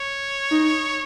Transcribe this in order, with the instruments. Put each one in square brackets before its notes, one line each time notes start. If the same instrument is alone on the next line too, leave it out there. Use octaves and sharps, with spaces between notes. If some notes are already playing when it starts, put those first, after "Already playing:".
Already playing: [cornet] C#5
[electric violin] D#4